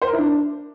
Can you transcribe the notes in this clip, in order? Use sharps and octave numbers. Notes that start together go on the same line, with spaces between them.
C5
A#4
E4
D4